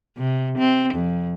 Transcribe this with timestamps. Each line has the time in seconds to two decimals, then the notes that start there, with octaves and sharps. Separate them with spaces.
0.18 C3
0.58 C4
0.94 F2